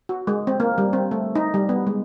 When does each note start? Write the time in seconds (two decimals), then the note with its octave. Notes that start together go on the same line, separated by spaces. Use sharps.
0.09 F#4
0.27 G#3
0.47 C4
0.60 A#3
0.78 G3
0.93 C4
1.11 A3
1.35 D#4
1.54 G3
1.69 B3
1.87 G#3